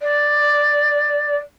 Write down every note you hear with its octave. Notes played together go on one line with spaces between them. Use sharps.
D5